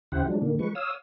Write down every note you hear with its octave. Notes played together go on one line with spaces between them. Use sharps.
D#2 C#3 E4 G4 C5 F#5
F3 F#3 G#3 D4
A#2 D3 D#3 A#3
F3 G#3 B4 C#6
C#5 F5 D#6 E6